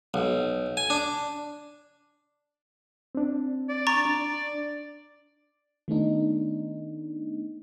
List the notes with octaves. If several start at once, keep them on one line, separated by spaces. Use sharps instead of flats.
B1
G#5
D4
C4 D4
D5
A#5 C#6 A6
D4
D#3 A3 B3 D4 D#4